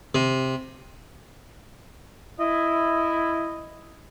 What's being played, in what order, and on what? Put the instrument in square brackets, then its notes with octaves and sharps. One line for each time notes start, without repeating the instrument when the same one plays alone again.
[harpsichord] C3
[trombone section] E4 [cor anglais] D#5